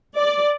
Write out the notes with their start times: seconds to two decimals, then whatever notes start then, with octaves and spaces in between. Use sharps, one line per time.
0.16 D5